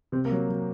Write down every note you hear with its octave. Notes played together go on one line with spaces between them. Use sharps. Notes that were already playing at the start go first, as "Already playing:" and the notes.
C3 C4
A#3
F#3
F#3